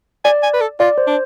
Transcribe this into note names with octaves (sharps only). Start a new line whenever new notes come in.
D5 G#5
G#5
B4
A4
F4 D5
C5
D4